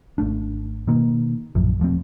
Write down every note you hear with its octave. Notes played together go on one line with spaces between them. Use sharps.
G#1 A3 D4
B2 D#3 A#3
D1 A#1 F#2 F3
E1 F3 A3 C4